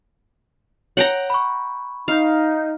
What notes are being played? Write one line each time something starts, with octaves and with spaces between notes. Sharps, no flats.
C#5 F#5 G5 A#5
B5 C#6
D#4 F5